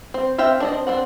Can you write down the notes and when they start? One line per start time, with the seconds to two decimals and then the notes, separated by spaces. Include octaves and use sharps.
0.14 C4
0.38 C4 E5 F5 G5
0.60 D4 D5 D#5
0.72 C4
0.87 C4 D4 F#5